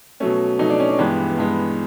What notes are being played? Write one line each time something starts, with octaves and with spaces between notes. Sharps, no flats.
B2 F#3 A3 C#4
B2 F#3 A3 D#4
D4
C#4
D4
G2 E3 G#3 B3 G4
G2 E3 G#3 B3